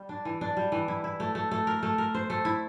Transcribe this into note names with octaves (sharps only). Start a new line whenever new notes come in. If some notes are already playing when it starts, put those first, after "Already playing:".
Already playing: G3
D4
E3
D4
G3
E3
E4
E4
A3
A3
A3
A#4
A3
A#4
C5
A3
E4